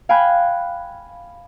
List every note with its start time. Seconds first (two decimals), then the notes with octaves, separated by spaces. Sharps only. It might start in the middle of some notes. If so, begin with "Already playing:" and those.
0.09 F5 G5 G#5 B5 F#6